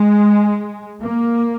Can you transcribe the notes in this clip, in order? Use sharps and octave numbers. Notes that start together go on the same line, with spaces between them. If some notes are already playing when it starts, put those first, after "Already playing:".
Already playing: G#3
A#3